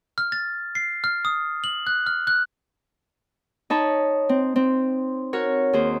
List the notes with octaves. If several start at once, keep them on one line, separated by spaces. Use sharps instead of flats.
F6
A6
C7
F6
D#6
F#7
F#6
F6
F#6
D#4 C#5 A5 B5
C4
C4
F#4 A#4 C#5
D#2 G#4 C5